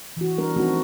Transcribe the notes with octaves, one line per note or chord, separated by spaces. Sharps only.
E3 F#4
G3 B3 D4 A#4
F3 A3 C4 D#4 F#4